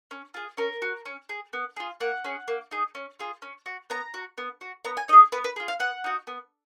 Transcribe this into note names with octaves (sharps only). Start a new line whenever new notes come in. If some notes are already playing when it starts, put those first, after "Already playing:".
C#4
F4 G#4
C#4 A#4
F#4
C#4
G#4
B3
F4 G#4
A#3 F#5
C#4 G#4
A#3
D#4 G#4
C#4
F4 G#4
C#4
F#4
B3 A#5
F#4
B3
F#4
B3 A#5
G#5
D#4 G#4 D#5
B3 B4
B4
F4 G#4
F5
B3 F#5
D#4 F#4
B3